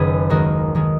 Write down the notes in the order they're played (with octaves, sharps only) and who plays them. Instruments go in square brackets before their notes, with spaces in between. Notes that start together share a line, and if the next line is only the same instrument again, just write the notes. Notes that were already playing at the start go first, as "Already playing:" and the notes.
Already playing: [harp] F#1 F#2 D#3 G#4 B4
D#2 D#3 G#3 F#4 A#4
D#3 G#3